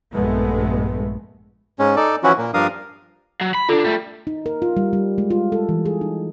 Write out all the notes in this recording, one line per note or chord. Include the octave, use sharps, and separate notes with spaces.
A#1 G2 G#3 A3 B3
G#2 G#3 C#4
D#4 A4 D5
E3 F3 C#4 E4 F#4
A#2 A#3
G2 F3 D4 A#4 F5 D#6
F#3
B5
D3 D4 F4 A4
G3 A3
D#4
A#4
F4
G3
G3
G#3
F4
A4
E3
G#4
D#4